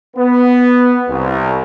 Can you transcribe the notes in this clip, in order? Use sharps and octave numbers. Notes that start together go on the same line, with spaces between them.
B3
C2